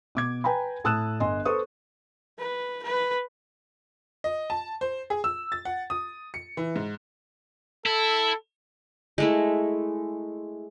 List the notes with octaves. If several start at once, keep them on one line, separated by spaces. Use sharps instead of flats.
B2 D6 G#6
B4 G5 G#5 A#5 B5
A2 A5 D#6 E6 F#6 E7
G1 D#5 G#5 C6
A4 B4 C5 C#6 D#6
B4
B4
D#5
A5
C5
G#4
E6
A6
F#5
D#6
C#7
E3
G#2
E4 A4
G#3 A3 E4